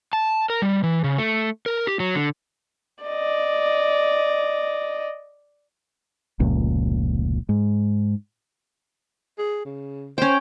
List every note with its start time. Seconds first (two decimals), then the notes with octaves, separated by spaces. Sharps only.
0.13 A5
0.50 A#4
0.62 G3
0.83 E3
1.04 C#3
1.18 A3
1.66 A#4
1.87 G4
2.00 F#3
2.15 D3
3.04 D5 D#5
6.40 F1 C#2 A#2
7.49 G#2
9.38 G#4
9.65 C#3
10.18 C#4 C5 G5